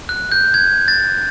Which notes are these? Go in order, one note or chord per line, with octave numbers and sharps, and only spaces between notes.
F#6
G6
G#6
A6